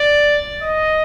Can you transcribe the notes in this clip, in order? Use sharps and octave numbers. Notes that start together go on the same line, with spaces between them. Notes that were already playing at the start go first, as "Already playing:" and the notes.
Already playing: D5
D#5